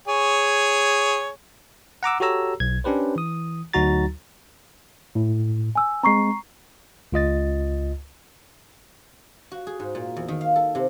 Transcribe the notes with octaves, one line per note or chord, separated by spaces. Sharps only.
G#4 C#5
F#5 A#5 D6 E6
F#4 G4 A4 C#5 A#5 E6
B1 G#6
C#4 D4 G4 B4 C5
E3 D#6
D2 F#3 D#4 F#4 A#5 A6
A2
G#5 E6
G#3 C4 A#5 C#6 C7
C#2 F4 D#5 A6
F#4
G#4
G#2
A#2
E2
D#3
F5
A4
C3